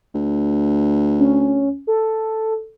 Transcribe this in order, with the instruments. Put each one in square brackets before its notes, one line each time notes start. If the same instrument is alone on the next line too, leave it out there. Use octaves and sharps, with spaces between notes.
[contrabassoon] D2
[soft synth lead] C#4
A4